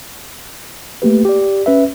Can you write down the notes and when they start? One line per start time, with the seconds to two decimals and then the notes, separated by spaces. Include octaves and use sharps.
1.02 A3 A#3 G4 B4
1.25 G4 D5
1.66 C#4 B4 E5